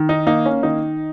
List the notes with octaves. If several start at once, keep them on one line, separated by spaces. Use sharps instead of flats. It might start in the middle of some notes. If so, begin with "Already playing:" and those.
Already playing: D#3
D#4
A#3 D#4
C#4
D#3 D#4